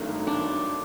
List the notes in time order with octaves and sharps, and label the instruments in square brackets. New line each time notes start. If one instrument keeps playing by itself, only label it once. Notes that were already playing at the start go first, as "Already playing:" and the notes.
Already playing: [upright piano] G#1 G2 D#3 F#3 A3
[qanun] D4